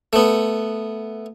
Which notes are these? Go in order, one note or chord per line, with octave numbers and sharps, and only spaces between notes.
A3 B3